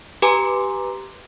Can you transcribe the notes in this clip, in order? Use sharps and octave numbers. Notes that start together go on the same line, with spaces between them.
G4 B4 G#5 A#5 C6 D6